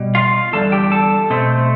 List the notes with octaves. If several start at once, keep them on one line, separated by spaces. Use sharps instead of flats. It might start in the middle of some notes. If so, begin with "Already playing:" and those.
Already playing: B2 G3
F4 F5
E2 D3 G3 A4 A5
G4 G5
A4 A5
B2 A3 C4